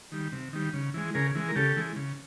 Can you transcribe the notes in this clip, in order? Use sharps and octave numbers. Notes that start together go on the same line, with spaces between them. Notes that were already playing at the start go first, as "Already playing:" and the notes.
D#3 G3
C3
D#3 G3
C#3
E3 G#3
C#3 G#4 A#4
E3 G#3
A#4
C#3 G4 A4
E3 G#3
C#3